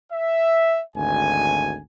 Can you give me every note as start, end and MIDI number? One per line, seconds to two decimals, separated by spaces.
0.12 0.81 76
0.96 1.78 32
0.96 1.78 38
0.96 1.78 80